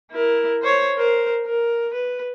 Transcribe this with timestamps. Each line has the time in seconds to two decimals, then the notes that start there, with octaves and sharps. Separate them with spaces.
0.12 E4 A#4
0.62 C5 C#5
0.97 A#4 C5
1.45 A#4
1.94 B4